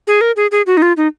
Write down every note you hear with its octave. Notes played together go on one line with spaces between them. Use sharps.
G#4
A#4
G#4
G#4
F#4
D#4
F4
D#4